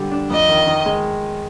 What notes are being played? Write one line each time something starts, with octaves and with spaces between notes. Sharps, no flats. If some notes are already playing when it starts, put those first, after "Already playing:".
Already playing: D3 G3
D4
F2 D#5
D#3
D#3
G#3